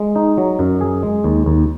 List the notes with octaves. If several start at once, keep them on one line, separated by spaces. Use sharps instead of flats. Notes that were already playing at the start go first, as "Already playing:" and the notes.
Already playing: G#3
D#4
F#3
F#2
G#4
G#3
D#2
D#2